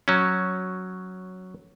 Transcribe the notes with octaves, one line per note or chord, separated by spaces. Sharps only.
F#3 C#4